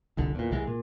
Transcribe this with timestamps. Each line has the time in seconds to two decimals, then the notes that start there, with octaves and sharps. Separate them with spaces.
0.17 F1 C2 D3
0.35 E2 A#2
0.51 C2 E3 G#3
0.67 A#2